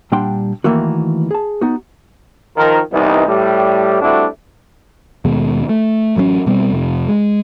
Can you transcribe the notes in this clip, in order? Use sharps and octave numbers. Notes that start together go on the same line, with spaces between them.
A#2 G3 D4 F#5 G5 C6
D#3 E3 A3 A#3 F#4
G#4 A5
B3 D#4 F#4
D#3 F3 A#4
C2 E3 G3 B3 D#4
A2 G3
G3 A3 C4 D4 E4 F#4
D#2 B2 G#3
A3
A1 F#3 G#3 C#4
B2 G3 A#3 C4
F2 C3
G#3